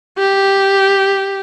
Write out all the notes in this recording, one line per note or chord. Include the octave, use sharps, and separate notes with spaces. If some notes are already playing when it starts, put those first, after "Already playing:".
G4